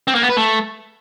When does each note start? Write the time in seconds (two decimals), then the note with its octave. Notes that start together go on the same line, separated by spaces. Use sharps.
0.08 C4
0.15 A#3
0.22 B3
0.29 B4
0.37 A3